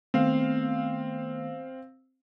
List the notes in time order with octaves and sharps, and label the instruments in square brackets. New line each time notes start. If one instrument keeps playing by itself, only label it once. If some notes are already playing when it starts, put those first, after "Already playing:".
[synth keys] D#3 A3 B3 [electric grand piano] C4 F5